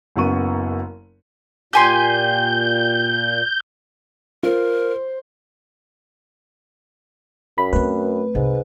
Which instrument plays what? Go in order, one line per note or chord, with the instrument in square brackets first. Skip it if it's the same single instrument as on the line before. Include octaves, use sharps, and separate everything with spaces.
[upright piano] F#1 F#2 B3 C#6 D#7
[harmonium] A#2 [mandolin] G4 G#5 C6 [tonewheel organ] G6
[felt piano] F4 [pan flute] A#4 [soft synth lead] C5
[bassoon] F#2 [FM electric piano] B5
[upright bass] A3 C4 [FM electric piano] B4
[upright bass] C2 [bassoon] G#2